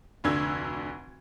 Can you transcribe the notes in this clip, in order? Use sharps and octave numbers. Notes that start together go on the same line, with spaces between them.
F1 D2 D3 E6 G#6